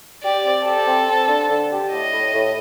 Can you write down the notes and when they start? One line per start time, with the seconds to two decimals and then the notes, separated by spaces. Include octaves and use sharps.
0.23 G4 D5
0.45 C4
0.65 G4 A4
0.86 C4
1.08 C4
1.27 D3
1.49 D3
1.70 G4
1.91 A2 D#5
2.12 A2
2.33 A2